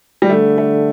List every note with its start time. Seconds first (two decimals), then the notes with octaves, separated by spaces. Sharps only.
0.22 G3
0.29 D3 A3
0.58 A3